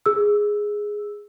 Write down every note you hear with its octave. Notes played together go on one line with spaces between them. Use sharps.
G#4 E6